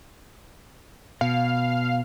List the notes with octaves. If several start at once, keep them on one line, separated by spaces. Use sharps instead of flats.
B2 F5